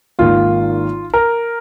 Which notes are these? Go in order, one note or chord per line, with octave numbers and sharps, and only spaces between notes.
G#1 G#2 D#3 A#3 F4
A#4